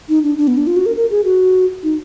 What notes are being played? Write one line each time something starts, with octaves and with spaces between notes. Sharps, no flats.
D#4
D4
D4
B3
D4
F4
F#4
A#4
A#4
G#4
F#4
D#4